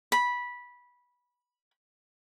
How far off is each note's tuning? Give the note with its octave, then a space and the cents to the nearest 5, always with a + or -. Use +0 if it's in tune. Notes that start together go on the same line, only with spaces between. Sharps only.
B5 -15